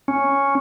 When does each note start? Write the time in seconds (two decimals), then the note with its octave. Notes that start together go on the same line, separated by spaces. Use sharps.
0.08 C#4